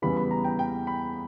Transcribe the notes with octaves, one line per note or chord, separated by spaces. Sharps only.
E2 C#3 E3 G3 B5
B5
A#5
G5
G5
B5